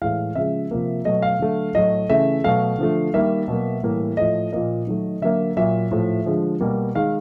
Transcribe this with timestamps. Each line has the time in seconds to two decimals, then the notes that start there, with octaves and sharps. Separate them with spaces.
0.02 A2 E3 G#3 F5
0.35 C#3 F3 G#3 E5
0.71 C3 F3 A#3
1.05 B2 F#3 A3 D#5
1.22 F5
1.39 D3 F#3 A3
1.75 A2 F#3 A3 D#5
2.09 C#3 E3 A3 E5
2.44 B2 F#3 A3 F5
2.79 D3 F3 A3
3.14 D#3 G3 A#3 E5
3.48 B2 F#3 A#3
3.83 A2 E3 G3 A#3
4.17 A2 F3 A3 D#5
4.53 A#2 F3 A#3 D#5
4.87 D#3 F#3 A3
5.22 D3 F#3 A#3 E5
5.57 A#2 F#3 A#3 E5
5.91 A2 F3 A3
6.26 D3 F3 G#3
6.61 B2 G3 A#3
6.95 D#3 G#3 F5